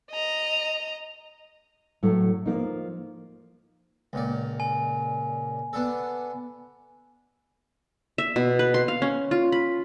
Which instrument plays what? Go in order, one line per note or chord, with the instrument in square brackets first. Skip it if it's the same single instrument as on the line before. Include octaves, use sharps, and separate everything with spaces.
[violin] D#5 A#5
[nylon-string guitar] A2 F#3 A3
F3 A#3 D#4
[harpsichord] C#2 A#2 D5
[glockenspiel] G#5
[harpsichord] B3 D4 A4
[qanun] E5
B2
B4
C6
F5
C#4
F4
B5